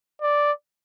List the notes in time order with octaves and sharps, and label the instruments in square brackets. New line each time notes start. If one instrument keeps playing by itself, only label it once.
[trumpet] D5